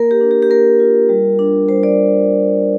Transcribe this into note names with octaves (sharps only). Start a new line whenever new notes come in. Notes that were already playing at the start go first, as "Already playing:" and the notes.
Already playing: A#3 A#4
G4
D4
G4
G4
A#3 A#4
F4
G3
D4
G3 C5
D5